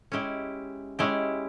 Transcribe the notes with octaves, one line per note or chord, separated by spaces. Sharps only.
G#3 C#4 E4 G4
G#3 C#4 E4 G4